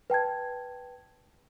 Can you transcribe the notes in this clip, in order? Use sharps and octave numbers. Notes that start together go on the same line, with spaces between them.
B4 G5 A5 G#6